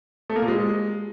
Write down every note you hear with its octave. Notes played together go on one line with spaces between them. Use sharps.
A3
A#3
A#2
G#3